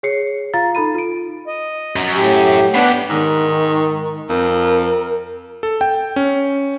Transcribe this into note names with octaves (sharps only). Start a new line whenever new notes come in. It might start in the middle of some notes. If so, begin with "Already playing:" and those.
G#4 C#5 C7 C#7
F4 F5 A#5 A6
D#4 A4 B5 D#7
F4 D7
D#5
F#2
A2 G4
B2 B3 D4 G4 F#5
G#2 D#3
F2 A#4
A4
G5
C#4